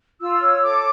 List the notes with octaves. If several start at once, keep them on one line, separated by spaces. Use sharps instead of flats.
F4 E6
C#5
A4 D6